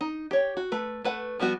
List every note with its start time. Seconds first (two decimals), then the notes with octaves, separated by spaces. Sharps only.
0.01 D#4
0.31 G4 C#5
0.57 F#4
0.72 A3 B4
1.04 A3 B4 F#5
1.39 F3 G3 B3 F#4